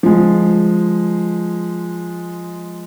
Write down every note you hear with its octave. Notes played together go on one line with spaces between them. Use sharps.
F3 G#3